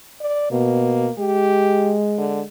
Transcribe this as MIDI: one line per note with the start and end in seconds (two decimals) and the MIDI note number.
0.21 0.49 74
0.52 1.08 47
0.52 1.13 58
1.18 2.46 56
1.18 1.96 67
2.18 2.41 50